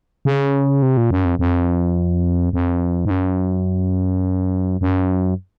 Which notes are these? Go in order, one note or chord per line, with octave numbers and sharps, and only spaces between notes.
C#3
C3
A#2
F#2
F2
F2
F2
G#2
F#2
F#2